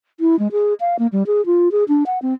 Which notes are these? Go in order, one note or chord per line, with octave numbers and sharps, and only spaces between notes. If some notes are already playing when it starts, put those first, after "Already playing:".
E4
G#3
G#4
F5
A#3
G3
G#4
F4
G#4
D4
F#5
C4